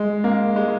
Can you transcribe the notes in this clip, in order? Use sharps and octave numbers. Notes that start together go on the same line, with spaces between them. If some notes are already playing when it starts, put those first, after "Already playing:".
Already playing: G#3
A#3
G#3